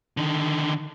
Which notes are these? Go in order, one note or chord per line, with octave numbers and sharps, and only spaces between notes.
D3 D#3